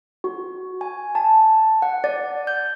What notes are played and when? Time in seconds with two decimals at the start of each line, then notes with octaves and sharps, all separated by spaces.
0.24 F#4
0.81 G#5
1.15 A5
1.82 F#5
2.04 D5
2.47 G6